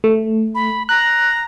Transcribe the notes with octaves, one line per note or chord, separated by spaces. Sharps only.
A3
B5
A#5 F#6